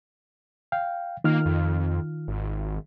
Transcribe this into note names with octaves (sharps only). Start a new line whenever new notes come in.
F5 G5
D#3 A#3 F4 F6
F2
G#1